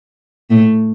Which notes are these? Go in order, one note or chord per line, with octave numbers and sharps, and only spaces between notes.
A2 A3